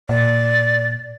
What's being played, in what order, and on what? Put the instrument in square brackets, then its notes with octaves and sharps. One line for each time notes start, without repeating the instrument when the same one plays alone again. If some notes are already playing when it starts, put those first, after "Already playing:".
[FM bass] A#2 [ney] D5